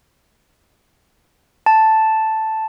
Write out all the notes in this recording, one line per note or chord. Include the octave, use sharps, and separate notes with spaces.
A5